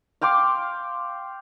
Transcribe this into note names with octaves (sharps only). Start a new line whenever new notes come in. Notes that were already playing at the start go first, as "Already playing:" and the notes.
F5 G5 C6 D6